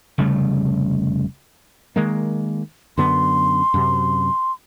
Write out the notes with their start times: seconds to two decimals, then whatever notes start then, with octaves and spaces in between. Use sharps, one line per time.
0.18 F1 C#3 G3 A3
1.96 D#3 G#3 A#3
2.98 F#2 D3 B3 C6
3.74 F#2 C3